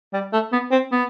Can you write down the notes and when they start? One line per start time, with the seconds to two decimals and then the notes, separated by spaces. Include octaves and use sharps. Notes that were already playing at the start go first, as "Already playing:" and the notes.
0.14 G3
0.33 A3
0.53 B3
0.71 C4
0.92 B3